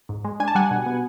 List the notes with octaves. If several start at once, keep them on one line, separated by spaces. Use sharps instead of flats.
G#2
G#3
D4 G#5
A5
G3 F#5 G#5
B2
B3